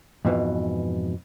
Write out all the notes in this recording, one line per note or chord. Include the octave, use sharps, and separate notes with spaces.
F2 G#2 B2 E3